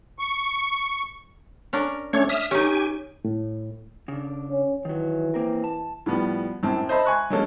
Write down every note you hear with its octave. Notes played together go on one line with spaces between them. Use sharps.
C#6
C#4 D4 A#4
A3 C#4 D4 C#5
E5 D#6 F6
C#4 D#4 G4 G#5
A2
C#3 D4
C#4
D#3 E3 F#3
A#3 C4 A#4
A5
A2 F3 G3 B3
F#2 A2 C4 A5
C5 D#5 E5 A5 B5
G#5 C#6 F#6
F#3 G#3 A#3 C#4 A4